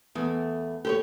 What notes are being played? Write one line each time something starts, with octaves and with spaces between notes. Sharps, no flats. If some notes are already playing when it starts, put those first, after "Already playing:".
E2 A3 B3
A3 G4 C5 C#5